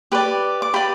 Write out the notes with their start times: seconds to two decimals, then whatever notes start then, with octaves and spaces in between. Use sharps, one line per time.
0.12 G4 B4 D5
0.62 D6
0.74 G4 B4 D5 B5